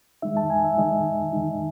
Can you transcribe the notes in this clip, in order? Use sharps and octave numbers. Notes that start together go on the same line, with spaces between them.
D#3 G#3 D#4 E5
A5
G#5
E5
D#3 G#3 D#4 D#5
D#3 G#3 D#4